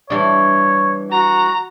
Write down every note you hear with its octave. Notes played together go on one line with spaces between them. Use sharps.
E3 G3 D4 C#5
F#4 A#5